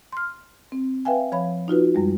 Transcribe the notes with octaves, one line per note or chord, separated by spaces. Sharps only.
C6 F6
C4
B4 E5 F5 G5 G#5
F3 C#5 F5 B5
D#4 F4 F#4 B4
F#2 G3 G#3